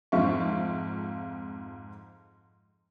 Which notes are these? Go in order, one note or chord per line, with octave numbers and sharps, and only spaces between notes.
F2 G#2 C4 F4 E5 C#6